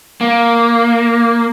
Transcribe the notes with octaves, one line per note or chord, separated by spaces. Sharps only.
A#3